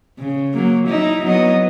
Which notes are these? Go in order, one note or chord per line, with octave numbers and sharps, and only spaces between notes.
C#3
F#3 A#3
D#4 E4
F#3 B3 D#5